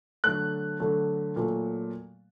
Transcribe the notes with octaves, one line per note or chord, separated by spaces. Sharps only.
D3 F#3 A3 F#6
D3 F#3 A3
A#2 F#3 A3